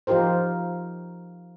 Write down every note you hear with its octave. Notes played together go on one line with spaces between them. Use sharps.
F3 D#4 F4 G4 A#4 C5